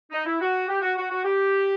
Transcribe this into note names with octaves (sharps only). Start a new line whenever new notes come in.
D#4
E4
F#4
G4
F#4
F#4
F#4
G4